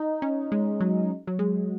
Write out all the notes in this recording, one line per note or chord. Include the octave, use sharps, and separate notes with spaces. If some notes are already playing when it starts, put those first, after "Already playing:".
Already playing: D#4
C#4
G#3
F#3
F#3
G#3